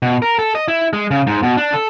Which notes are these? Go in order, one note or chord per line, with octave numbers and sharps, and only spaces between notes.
B2
A#4
A4
D#5
E4
G#3
C#3
G#2
B2
D4
A4